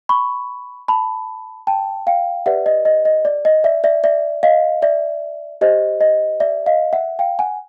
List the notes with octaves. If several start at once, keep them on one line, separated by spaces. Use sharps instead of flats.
B5 C#6
A5 B5
G5 A5
F5 G5
G4 B4 D5 E5 F#5
D#5
D#5
D#5
D5
D#5
D5 E5
D5 E5
D5 E5
D#5 F5
D5 E5
G4 C5 D#5
D#5
D5 E5
D#5 F5
E5 F#5
F5 G5
F#5 G#5